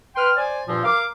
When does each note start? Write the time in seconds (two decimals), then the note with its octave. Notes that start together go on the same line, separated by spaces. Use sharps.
0.16 B4 G5 C6 F6
0.37 C5 D5 G#5
0.67 G2 A#2 F3 C4
0.84 A#4 F5 D6